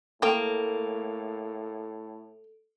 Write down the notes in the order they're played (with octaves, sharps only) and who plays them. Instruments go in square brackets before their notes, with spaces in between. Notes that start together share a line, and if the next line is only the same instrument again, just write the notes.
[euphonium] A2 [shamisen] A3 G5 [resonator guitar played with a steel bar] A#3 [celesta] A4 D7 F7